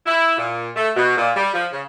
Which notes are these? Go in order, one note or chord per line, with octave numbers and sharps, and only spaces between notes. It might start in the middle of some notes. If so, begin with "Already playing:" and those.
E4
A#2
A3
B2
A#2
G3
F3
C#3